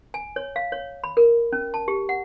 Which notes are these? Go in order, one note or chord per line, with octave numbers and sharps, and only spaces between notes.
G#5
C#5
F5
C#5
B5
A#4
C#4
A5
G4
F#5